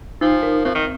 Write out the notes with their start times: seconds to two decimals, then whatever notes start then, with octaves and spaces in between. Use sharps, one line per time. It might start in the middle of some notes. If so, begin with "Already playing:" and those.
0.21 F3 D#4
0.43 A#4
0.65 F3 C4
0.75 D#3